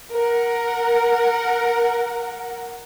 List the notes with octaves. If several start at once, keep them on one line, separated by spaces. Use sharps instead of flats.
A#4 F#5